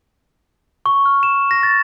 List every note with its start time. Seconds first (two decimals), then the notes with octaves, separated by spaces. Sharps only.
0.86 C#6
1.06 F6
1.23 E7
1.51 A#6
1.63 A6